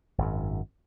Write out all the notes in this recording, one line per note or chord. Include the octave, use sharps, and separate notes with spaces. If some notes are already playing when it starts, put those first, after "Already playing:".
G#1 F#2